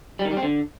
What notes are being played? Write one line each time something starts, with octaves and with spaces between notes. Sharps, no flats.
G3
D#3
G3
C4
D3